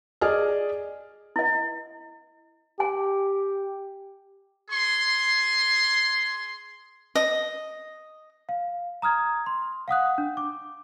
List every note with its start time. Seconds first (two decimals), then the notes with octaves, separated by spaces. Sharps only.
0.21 G#4 D5 D#5 G#5 F6
1.36 E4 D#5
2.80 G4 G#5
4.70 G#4 C6
7.15 D#5
8.49 F5
9.02 A#5 D#6 F6 G#6
9.46 C6
9.88 F5 F#5 D#6 F#6
10.18 D4
10.37 D6